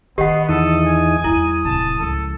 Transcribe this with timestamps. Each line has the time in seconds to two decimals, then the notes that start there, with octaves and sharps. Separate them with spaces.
0.18 D#3 B3 C#4 G4 D#5 F#5
0.49 E2 D#4 A4 D#6
0.87 G#5
1.24 E2 G3 E4 D#6
1.65 D1 C3 A5
2.00 C#2 F3 A4